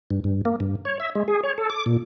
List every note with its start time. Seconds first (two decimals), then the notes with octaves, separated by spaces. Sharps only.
0.10 G2
0.24 G2
0.45 A#3
0.60 G2
0.85 C#5
1.00 E5
1.15 G#3
1.28 G#4
1.43 C#5
1.58 A4
1.70 D6
1.86 A#2